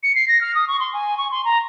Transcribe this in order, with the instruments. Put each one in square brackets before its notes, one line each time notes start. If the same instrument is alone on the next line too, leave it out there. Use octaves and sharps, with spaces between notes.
[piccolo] C#7
C7
A#6
F6
D#6
C#6
C6
G#5
C#6
C6
A#5